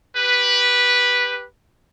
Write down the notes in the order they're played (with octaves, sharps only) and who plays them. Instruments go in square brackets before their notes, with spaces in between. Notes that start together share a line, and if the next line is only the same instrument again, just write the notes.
[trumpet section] G4 B4